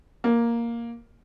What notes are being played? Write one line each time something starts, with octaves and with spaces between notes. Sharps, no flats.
A#3